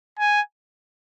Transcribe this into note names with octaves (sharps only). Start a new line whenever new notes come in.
G#5